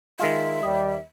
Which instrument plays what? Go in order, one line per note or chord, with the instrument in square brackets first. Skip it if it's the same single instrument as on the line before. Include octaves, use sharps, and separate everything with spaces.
[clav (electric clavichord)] D#3 G#3 F4 [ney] E5
[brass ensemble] D#2 G3 [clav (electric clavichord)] D#5